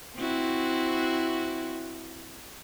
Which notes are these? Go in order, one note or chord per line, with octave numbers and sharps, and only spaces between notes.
C4 E4 F#4